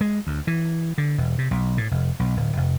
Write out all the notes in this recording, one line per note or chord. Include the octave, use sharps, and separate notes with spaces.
G#3
D2
E3
D3
E1
C3
B1
A2
F1
B1
D1
F1